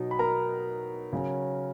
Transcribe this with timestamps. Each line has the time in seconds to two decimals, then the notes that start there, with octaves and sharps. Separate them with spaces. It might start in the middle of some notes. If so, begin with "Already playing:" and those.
Already playing: B2 F#3 D#4
0.11 B5
0.19 A#4 A#5
1.13 C#3 F#3 C#4